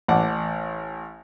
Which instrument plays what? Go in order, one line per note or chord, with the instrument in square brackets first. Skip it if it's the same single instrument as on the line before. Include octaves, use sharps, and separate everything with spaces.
[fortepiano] A1 F#5 A5 D6